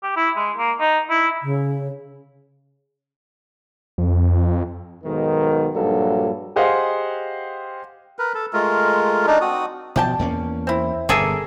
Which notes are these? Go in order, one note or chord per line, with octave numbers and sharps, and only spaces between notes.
G4
E4
G#3
A#3
D#4
E4
C#3
F2
B1 G#2 D#3
A#1 G2 F#3 A4
G4 G#4 C5 D#5 F5 F#5
A#4 B4
A4
G#3 A3 F4 A#4
D4 D#4
C4 F#4 D#6
B2 F3 D5 G5 A5
E2 A#3 C#4
C4 E4
G1 B2 A#3 G#4 A4